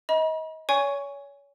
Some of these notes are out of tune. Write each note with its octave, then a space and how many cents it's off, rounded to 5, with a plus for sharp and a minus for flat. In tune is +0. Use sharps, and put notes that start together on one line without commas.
D#5 +30 B5 -45
C#5 +30 G#5 -10 C#6 +10